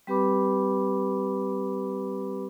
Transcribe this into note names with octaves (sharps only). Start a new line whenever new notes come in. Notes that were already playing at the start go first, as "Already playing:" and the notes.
G3 C4 G4 B4 B5 D6